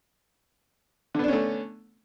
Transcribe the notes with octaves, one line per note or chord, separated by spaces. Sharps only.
D3 A3 B3 C#4 D4